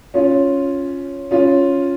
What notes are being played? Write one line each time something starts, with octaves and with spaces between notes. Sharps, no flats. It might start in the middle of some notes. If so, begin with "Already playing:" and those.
C#4 F4
C#4 F4